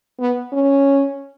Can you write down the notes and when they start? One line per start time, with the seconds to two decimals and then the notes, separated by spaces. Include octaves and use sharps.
0.20 B3
0.53 C#4